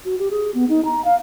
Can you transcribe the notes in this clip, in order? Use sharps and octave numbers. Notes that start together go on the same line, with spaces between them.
F#4
G4
G#4
B3
D#4
A#5
F5